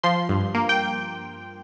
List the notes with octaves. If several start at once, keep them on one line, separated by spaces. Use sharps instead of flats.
F3 C6
G2
A#3
G5